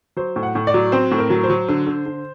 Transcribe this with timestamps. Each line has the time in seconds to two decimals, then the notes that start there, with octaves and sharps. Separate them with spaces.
0.17 F#3 C5
0.36 A2
0.43 F#5
0.55 A2
0.67 D5
0.74 F#3
0.92 C4 C5
1.11 A2
1.18 A#4
1.30 F#3
1.44 C5
1.50 F#3
1.69 D3
1.87 D3
2.06 D3